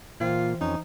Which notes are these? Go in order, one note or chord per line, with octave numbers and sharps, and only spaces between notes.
A#2 E3 F4 C5 G5
F2 C#4 D#4